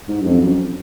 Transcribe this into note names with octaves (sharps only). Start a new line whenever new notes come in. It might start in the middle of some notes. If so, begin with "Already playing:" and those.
G#2
F#2
F2
F#2